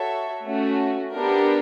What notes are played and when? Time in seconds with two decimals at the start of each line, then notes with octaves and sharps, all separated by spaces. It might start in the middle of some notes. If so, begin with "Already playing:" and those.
Already playing: F#4 A4 C#5 E5
0.45 A3 C#4 F#4
1.13 B3 D4 G4 A#4